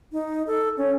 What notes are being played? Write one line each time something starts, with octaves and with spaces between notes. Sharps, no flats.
D#4
A4
C#4